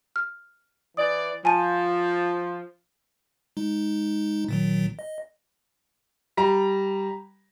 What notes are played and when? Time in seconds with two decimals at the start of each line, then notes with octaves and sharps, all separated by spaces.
0.16 F6
0.97 E3 D5 D#6
1.45 F3 G#5 A5 D#7
3.57 G#3 D#4
4.49 A#2 D#3 F#3
4.99 D#5
6.37 G3 A#5